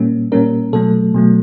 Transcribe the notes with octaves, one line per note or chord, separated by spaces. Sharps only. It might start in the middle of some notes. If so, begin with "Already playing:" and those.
Already playing: A#2 G3 A#3 C#4
A#2 G3 A#3 C#4 A#4
B2 F#3 A3 A4
B2 F#3 A3